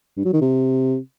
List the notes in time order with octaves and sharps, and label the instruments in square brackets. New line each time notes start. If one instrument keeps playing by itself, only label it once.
[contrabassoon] G2
F#3
D#3
C3